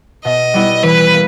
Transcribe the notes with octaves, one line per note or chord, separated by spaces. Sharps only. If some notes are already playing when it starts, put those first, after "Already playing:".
B2 D#5
G3 B3 E4
E3 B4
A#3